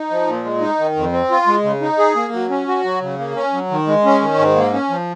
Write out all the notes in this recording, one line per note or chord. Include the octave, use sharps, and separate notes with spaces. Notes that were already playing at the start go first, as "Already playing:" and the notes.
Already playing: D#4
F3
A#2
G#3
D#4
D#3
F2
C4
F4
G#3
C#3
D#4
G#4
A#3
F#3
C#4
F#4
F#3
C#3
A#3
C#4
F#3
D#3
G#3
C#4
D#3
G#2
A#3
C#4
F3